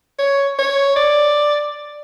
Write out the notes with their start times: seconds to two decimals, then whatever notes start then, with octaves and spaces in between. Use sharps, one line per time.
0.19 C#5
0.59 C#5
0.96 D5